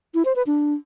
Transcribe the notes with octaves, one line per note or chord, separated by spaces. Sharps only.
E4
C5
B4
D4